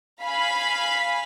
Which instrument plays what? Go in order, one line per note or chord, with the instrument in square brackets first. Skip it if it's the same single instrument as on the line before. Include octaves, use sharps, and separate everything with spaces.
[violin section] F5 G#5 B5 B6